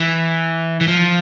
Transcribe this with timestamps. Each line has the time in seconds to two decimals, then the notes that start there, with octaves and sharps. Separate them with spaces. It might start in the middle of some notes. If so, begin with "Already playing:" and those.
Already playing: E3
0.81 E3
0.88 F3